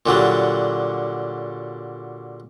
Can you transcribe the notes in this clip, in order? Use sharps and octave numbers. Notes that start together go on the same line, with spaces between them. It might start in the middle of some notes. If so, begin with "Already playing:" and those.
A#2 D3 F#3 G3